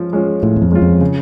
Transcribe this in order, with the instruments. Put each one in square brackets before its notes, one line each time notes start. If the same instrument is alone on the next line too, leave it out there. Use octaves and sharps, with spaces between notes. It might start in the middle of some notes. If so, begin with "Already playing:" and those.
Already playing: [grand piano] F3 G#3 C#4
G#3 C#4 F4
[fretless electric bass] A2 [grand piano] F3
[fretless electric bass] E2
F2
[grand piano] G#3 C#4 F4
[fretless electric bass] F2
[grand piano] C#3